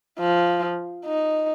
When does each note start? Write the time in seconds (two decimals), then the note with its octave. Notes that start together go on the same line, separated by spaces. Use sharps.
0.20 F3
1.06 D#4